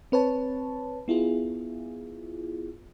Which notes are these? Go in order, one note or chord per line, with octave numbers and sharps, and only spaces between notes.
C4 B4 C#5 A5
B3 E4 F4 G#4